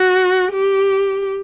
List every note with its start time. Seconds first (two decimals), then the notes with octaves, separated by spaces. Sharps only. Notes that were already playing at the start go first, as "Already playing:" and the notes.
Already playing: F#4
0.52 G4